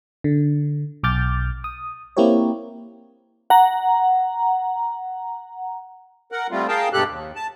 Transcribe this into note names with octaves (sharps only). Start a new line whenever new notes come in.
D3
B1 D6 F6 G6 A6
D#6
A#3 C4 E4 G4 A#4 C#5
F#5 A#5
A#4 F#5
G3 A3 C4 F4
G#4 A#4 F5 G5 A5
G2 B2 G#3 G4 A4 F#6
D#2
A5